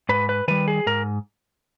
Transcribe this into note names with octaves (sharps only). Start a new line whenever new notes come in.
G#2 B4
B4
D#3 G3 B4
G#4
G#2 A#4